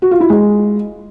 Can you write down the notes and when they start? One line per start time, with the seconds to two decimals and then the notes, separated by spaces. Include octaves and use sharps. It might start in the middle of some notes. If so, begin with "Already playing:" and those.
0.02 F#4
0.11 F4
0.20 E4
0.30 G#3